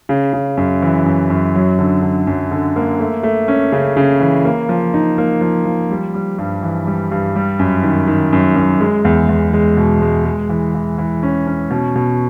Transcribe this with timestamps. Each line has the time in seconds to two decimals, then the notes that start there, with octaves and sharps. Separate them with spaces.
0.09 C#3
0.33 C#3
0.57 F#2
0.82 E3
1.06 F#2
1.30 F#2
1.55 F#3
1.79 D3
2.02 D3
2.27 F#2
2.51 D3
2.76 A#3
3.00 A3
3.23 A3
3.48 C#4
3.72 C#3
3.97 C#3
4.20 E3
4.45 A#3
4.69 F3
4.94 D#4
5.18 A#3
5.41 F3
5.65 F3
5.91 G3
6.14 G3
6.39 G2
6.63 E3
6.87 G3
7.12 G2
7.36 G3
7.59 F#2
7.83 D#3
8.07 D#3
8.33 F#2
8.56 F#2
8.80 G#3
9.05 E2
9.29 E2
9.53 G#3
9.77 B2
10.02 G#3
10.25 G#3
10.49 E3
10.74 E3
10.98 E3
11.23 C#4
11.47 C#4
11.70 B2
11.95 B2